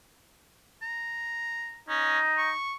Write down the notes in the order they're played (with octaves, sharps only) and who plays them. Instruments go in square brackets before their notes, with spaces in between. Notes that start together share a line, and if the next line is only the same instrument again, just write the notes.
[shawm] A#5
[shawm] C#4 [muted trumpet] D#4
[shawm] C#6